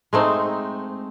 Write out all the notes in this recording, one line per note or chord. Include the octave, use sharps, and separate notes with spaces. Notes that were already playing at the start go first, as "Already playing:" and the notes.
G#3 A3 C4 D#4